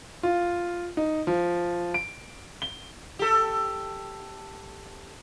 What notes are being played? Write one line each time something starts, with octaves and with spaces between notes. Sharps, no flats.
F4
D#4
F3
D7
G7
G4 A4